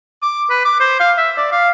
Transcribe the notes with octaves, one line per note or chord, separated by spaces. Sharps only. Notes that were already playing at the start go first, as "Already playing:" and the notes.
D6
B4
D6
C5
F5
E5
D5
F5